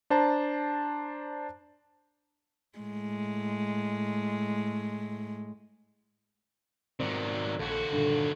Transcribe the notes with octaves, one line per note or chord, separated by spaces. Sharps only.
D4 C5 A5 A#5
A2 G#3
G#2 D#3 F#3 B3 C4 D5
A#1 D#2 F#4 A4
G2 A#2 D3